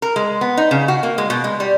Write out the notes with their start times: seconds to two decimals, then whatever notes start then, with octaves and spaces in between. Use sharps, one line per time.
0.02 A#4
0.16 G#3
0.41 B3
0.57 D#4
0.71 C#3
0.88 F#4
1.03 A#3
1.18 G#3
1.30 B2
1.44 G#3
1.60 G3